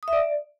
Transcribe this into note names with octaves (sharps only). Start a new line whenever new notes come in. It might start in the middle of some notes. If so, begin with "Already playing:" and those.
D#6
E5
D5